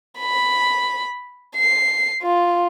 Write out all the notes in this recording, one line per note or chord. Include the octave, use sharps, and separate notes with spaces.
B5
C7
F4